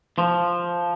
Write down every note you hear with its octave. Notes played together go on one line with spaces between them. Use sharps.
F3